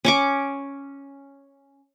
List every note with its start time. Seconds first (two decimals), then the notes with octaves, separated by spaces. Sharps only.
0.05 C#4 C#6 D6